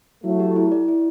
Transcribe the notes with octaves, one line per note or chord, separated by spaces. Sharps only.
F#3 A3 E4
G4
E4
D5
E4